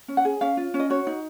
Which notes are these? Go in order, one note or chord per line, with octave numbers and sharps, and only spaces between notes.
C#4
F#5
G#4
C#4 F5
F4
C#4
D#5
F#4 C#5
D#4